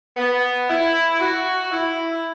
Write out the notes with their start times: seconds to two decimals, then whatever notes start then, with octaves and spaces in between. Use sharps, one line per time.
0.17 B3
0.69 E4
1.20 F#4
1.71 E4